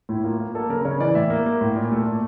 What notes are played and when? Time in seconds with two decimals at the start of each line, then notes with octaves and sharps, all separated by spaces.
0.09 A2 E4
0.24 A#3 F4
0.39 A#3
0.55 A#3 A4
0.69 C#3 A#4
0.85 C#3 C#5
1.00 E3 D5
1.15 A2 E5
1.30 A#3
1.46 A#3
1.61 A2
1.76 A#2
1.91 A3
2.06 A#2